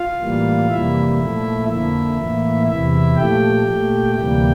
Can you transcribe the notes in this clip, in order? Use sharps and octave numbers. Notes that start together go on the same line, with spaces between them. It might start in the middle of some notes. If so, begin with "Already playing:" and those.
Already playing: F4 F5
A2 E3 G3 A#3
F2 C3 E3 G3 A#3 E4 E5
A#2 F3 A3
F2 D3 F3 A#3 E4 E5
A2 E3 A#3
E2 C3 E3 E4 E5
A#2 F3 A3 G4 G5
A#2 A3
D2 C3 E3 G3 A#3 G4 G5